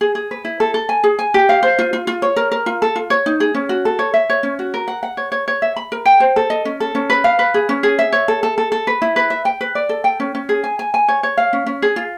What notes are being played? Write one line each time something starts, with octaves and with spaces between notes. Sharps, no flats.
G#4
G#4
B4
E4
A4
A4
G#5
G#4
G#5
G4
F5
C5
F4
F4
F4
C#5
A#4
A#4
F4
A4
F4
C#5
D#4
G#4
C#4
F#4
A4
C#5
E5
C#5
C#4
F#4
A#4
F#5
F#5
C#5
C#5
C#5
E5
B5
A#4
G5
C5
A4
D#5
C#4
A4
C#4
B4
F5
B4
G#4
C#4
G#4
E5
C#5
A4
A4
A4
A4
B4
E4
B4
E5
G5
B4
D5
A4
G5
C#4
C#4
G#4
G#5
G#5
G#5
C#5
C#5
F5
C#4
C#4
G#4
F4